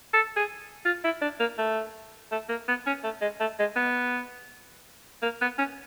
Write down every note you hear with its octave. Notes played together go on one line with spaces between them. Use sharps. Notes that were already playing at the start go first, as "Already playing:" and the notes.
A4
G#4
F4
E4
D4
A#3
A3
A3
A#3
B3
C#4
A3
G#3
A3
G#3
B3
A#3
B3
C#4